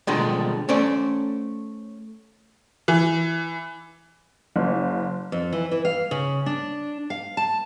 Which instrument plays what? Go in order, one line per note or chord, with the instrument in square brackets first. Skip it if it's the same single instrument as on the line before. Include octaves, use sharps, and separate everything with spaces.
[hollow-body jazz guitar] B2 D3 D#3 F3 G3 G#3
A3 C#4 C5 D5
[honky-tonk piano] E3
F#1
[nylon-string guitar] F2
E3
E3
F5
C#3
D4
F5
A5